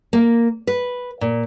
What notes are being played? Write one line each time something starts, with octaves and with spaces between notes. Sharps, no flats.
A#3
B4
A#2